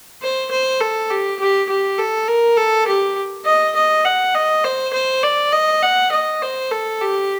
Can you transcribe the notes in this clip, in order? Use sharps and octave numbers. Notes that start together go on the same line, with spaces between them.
C5
C5
A4
G4
G4
G4
A4
A#4
A4
G4
D#5
D#5
F#5
D#5
C5
C5
D5
D#5
F#5
D#5
C5
A4
G4